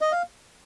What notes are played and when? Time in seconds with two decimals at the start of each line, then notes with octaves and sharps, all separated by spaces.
0.01 D#5
0.12 F5